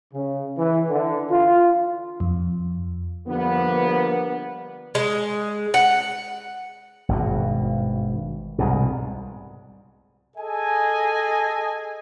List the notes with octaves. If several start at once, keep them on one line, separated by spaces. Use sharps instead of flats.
C#3
E3
D3
F4
F2
D3 F3 G3 A#3 B3
G#3
F#5
G#1 G2 B2
C2 G#2 B2
G#4 A4 D#5 G#5